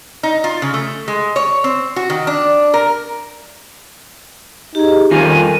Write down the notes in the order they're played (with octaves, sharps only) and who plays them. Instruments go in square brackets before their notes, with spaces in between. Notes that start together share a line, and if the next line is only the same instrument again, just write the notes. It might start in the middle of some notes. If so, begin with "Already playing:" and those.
[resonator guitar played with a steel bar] D#4
F4
C#3
A3
G#3
C#5
C4
F#4
D#3
D4
A#4
[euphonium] D#4 [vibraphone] G4 G#4
[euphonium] F2 [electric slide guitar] D#3 G3 F4 [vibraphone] A#4 [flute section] G#5